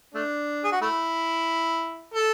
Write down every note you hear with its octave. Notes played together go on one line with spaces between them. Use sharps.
A3 D4
G#4
F#4
A3 E4
A4